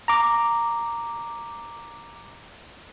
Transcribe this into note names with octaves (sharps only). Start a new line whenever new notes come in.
A#5 D6